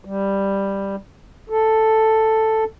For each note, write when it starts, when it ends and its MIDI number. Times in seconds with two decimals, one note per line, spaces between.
0.05 0.96 55
1.50 2.64 69